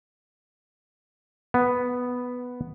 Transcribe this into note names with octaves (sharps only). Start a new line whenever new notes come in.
B3